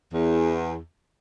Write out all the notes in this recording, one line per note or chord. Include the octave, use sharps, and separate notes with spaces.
E2